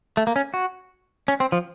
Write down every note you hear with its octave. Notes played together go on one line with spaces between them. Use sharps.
A3
A#3
C#4
F#4
C#4
C4
F3